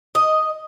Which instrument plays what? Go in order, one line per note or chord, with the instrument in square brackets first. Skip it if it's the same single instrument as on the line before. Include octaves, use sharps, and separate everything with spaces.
[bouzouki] D#5